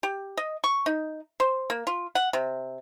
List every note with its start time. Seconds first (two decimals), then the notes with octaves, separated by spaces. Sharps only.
0.03 G4
0.37 D#5
0.64 C#6
0.86 D#4
1.40 C5
1.70 A#3
1.87 F4
2.15 F#5
2.33 C3